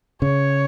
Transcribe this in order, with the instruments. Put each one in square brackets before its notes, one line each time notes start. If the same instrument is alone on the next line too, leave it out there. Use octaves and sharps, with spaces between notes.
[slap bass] C#3 [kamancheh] C#5